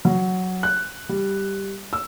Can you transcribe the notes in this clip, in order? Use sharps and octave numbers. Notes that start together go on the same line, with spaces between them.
F#3
F#6
G3
E6